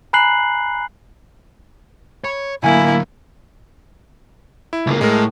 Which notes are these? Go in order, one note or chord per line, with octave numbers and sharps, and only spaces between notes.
G#5 A#5 B5 F#6 C7 F#7
C#5 B5
D3 F#3 A#3 E4 F#5 G#5 B5
E4
C#2 A#3
A2 G#3 A#4